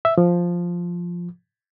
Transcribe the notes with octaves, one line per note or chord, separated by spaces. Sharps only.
E5
F3